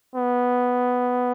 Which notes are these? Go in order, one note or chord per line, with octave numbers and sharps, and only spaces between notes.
B3